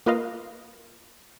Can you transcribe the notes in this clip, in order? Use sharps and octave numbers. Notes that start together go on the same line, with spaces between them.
A#3 F4 B4 D#5 F5